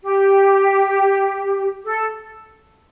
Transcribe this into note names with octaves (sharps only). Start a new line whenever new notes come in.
G4
A4